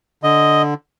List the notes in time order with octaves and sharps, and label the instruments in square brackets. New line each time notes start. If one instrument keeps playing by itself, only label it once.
[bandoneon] D3 D#5